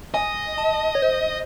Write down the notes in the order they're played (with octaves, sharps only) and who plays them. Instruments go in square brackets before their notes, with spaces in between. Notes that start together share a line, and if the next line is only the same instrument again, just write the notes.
[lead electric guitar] D#5 [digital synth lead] G#5
[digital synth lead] A5
C#5
C5